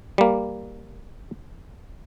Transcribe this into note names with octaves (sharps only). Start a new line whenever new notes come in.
G3 A#3